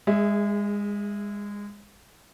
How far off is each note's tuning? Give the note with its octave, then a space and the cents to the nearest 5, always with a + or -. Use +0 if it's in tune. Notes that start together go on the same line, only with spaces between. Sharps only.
G#3 -25 G#4 +0 E5 +0